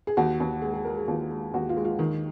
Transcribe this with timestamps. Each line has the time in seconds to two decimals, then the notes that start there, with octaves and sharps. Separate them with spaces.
0.07 G#4
0.17 D#2 F#4
0.40 D#2
0.62 G#3 G#4
0.74 G#4
0.85 G#3 A#4
0.97 G#4
1.08 D#2 F4
1.31 G#3
1.54 D#2 F#4
1.69 F4
1.77 G#3
1.85 F4
1.99 D#3